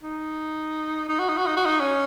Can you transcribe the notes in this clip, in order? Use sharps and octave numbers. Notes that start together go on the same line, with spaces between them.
D#4
D#4
F#4
D#4
F#4
D#4
F#4
D#4
C#4